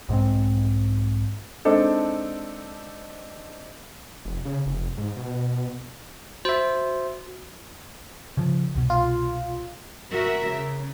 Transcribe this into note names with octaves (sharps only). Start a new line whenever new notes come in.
B1 G#2 G#3 C4
G#3 C4 D4 D#4 A4
F1
C#3
F1
G#2
B2
F#4 C5 E5
C#3 F3
C2 B2
F4
F#4 A#4 E5
C#3